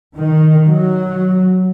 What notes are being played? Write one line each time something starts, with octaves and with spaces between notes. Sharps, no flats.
D#3
F#3